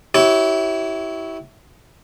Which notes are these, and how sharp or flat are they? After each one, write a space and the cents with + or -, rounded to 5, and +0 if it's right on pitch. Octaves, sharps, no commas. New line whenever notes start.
E4 -15 G4 -35 C#5 +0